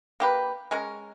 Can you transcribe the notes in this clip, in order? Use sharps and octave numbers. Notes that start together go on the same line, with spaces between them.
A#3 G4 B4
G#3 C#4 A#4